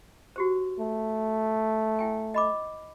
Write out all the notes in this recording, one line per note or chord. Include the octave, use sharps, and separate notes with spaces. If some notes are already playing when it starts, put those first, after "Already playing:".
F#4 G4 C5
A3
E4 G5 G#5
D#5 B5 D6